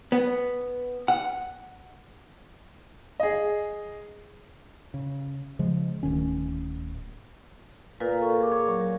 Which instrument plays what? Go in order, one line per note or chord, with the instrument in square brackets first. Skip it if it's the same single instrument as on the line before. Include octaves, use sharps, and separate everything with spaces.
[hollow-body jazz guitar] B3
F#5
[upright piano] G#4 D#5
[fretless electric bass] C#3
C#3 F3 G#3
D1 D#3 C#4
[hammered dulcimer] A#2 [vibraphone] F4 B4
[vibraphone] A4 C#6
G#4 D6
[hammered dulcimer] C#5
[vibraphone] F#3 [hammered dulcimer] C#6
[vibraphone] A#4